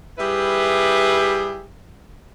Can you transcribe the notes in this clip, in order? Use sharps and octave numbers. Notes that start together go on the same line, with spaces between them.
G3 E4 G4 G#4 B4 E5